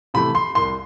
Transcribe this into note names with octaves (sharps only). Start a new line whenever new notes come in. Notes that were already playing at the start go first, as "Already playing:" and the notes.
C3 E3 A3 B5
C6
C2 C6